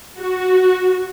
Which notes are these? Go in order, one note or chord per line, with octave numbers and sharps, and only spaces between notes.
F#4